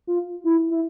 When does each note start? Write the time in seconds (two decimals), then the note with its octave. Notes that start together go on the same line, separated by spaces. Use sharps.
0.07 F4
0.44 E4
0.70 E4